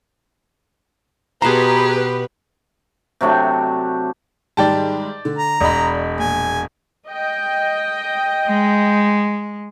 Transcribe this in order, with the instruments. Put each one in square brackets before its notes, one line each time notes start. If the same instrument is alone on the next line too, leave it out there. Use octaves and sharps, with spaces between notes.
[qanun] B2 A5 C6 [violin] G4 [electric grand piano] G#4 A#5 [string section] B4
[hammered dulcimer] C3 F#3 A3 D4
[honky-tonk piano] G#2 D#3 G3 [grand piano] D5 G5 A5
[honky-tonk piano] D3
[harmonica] A#5
[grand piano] E1 [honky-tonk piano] D5 D#5 B5
[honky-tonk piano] A#1 [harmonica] G#5
[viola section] D#5 G5
[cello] G#3